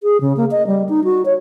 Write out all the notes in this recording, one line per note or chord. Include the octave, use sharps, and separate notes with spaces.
G#4
C#3
A#3
D#5
G3
D#4
F#4
C#5